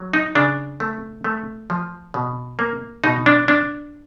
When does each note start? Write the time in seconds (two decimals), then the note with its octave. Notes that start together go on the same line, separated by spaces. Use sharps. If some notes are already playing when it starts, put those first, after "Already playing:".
Already playing: F#3
0.13 D#4
0.35 C#3 D4
0.80 A3
1.24 A3
1.70 F3
2.14 B2
2.59 A#3
3.04 B2 D#4
3.26 D4
3.48 D4